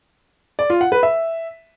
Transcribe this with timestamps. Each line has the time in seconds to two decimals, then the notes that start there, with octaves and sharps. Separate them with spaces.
0.59 D5
0.70 F4
0.81 F#5
0.92 B4
1.03 E5